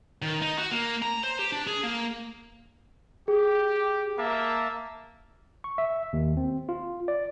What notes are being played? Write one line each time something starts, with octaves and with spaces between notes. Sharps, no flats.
D#3
D#4
F#4
A#3
A#5
C5
G4
D4
G#4
A#3
G4 G#4
A#3 E5 A5
C#6
E5
D#2
C4
F4
D5